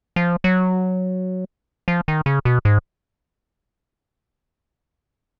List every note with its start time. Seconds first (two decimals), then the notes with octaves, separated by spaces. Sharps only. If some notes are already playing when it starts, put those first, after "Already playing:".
0.16 F3
0.44 F#3
1.88 F3
2.08 D#3
2.26 C#3
2.45 B2
2.65 G#2